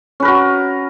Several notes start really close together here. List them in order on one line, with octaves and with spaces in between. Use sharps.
C#4 B4 A#4 F#4